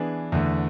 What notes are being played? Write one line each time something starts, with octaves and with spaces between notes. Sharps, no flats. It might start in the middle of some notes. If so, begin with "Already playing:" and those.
Already playing: E3 B3 D4 G#4
E2 D3 A3